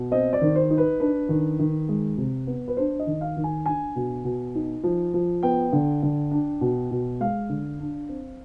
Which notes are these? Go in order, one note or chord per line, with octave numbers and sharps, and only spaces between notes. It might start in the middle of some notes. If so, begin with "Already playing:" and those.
Already playing: B2
C4 D#5
D5
D#3
C5
D#4
B4
D4 B4
D#3
D#3
G#3
C3
B3
B4
D4 C5
D#5
D#3
F5
D#3
G#5
D4 G#5
B2
B2
D#4
F3
F3
B3 G5
D3
D3
D4
B2
B2
G#3 F5
D3
D4
C4